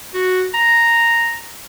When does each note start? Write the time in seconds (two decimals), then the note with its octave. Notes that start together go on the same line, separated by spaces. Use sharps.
0.14 F#4
0.54 A#5